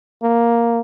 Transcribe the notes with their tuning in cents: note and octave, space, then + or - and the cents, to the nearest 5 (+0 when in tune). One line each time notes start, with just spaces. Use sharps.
A#3 +5